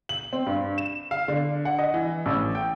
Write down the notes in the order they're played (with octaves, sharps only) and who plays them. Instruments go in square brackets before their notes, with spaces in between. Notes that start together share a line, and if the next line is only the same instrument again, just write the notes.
[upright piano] F#7
C4
G2
E7
F5
D3
F#5
D#5
E3
A1
G5